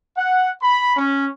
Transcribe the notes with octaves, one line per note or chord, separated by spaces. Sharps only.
F#5
B5
C#4